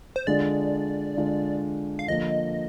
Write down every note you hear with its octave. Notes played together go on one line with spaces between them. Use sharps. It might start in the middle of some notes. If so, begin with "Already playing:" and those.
C5
D3 G#3 D4 F4 D5
D3 G#3 D4 F4
F5
D3 F3 A#3 D#5